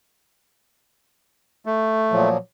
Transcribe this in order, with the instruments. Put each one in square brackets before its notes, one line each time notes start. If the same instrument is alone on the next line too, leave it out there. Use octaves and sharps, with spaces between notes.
[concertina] A3
[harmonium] A#2 F3 F#3